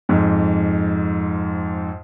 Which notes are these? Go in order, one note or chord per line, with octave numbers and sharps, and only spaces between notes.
F2 G#2